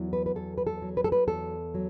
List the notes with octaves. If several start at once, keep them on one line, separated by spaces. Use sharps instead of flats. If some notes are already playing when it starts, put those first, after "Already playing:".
Already playing: E2 F#3
B4
B4
E2 A4
B4
A4
F#3
B4
A4
B4
E2 A4
F#3